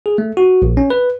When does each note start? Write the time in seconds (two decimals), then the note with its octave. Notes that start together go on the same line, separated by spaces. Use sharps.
0.06 G#4
0.18 A3
0.37 F#4
0.62 A#1
0.77 C#4
0.90 B4